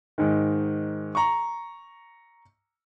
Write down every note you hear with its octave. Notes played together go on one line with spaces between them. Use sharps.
G#2 D#3
A#5 C#6